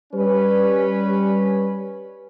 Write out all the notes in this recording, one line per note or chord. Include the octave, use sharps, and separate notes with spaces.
G3 C#4 B4